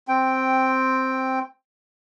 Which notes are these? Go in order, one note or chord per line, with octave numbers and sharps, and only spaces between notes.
C4 G5